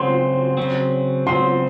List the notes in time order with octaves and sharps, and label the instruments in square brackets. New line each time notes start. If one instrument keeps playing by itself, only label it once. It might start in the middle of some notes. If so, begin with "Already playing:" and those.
Already playing: [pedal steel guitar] C#3 F#3 C4 [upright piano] C6
[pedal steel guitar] C#3 F#3 C4
[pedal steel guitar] C#3 F#3 C4 [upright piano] C6